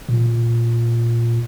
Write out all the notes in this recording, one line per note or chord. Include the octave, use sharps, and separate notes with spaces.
A#2